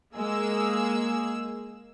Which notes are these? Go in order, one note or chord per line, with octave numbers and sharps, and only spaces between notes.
G#3 A#3 G#4 E6